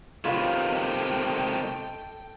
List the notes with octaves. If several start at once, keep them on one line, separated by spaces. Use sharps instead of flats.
C3 D#3 F4 A4 B4 C#5 G5